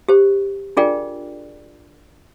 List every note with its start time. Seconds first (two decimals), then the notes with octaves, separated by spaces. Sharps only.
0.08 G4 C5
0.77 D4 F4 G#4 A#4 D5 G5